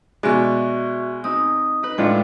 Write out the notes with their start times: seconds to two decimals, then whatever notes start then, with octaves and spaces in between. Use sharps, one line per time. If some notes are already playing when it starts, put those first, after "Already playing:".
0.23 B2 G#3 F#4 D5 E5 C#6
1.24 C4 D#4 D#6
1.83 D#4 B4
1.98 A2 G#3 D4 E4 F4 G5